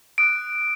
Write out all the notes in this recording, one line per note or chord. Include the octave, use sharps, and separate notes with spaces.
D#6 F#6 D7